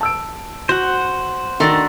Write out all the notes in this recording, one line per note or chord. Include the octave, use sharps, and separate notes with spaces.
A5 E6 D7
F#4 C5 F#5
D#3 A3 D4 F#4 A#5 C6